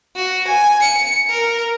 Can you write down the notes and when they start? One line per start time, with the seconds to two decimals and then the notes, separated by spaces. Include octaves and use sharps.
0.16 F#4
0.48 G#5
0.80 C#7
1.30 A#4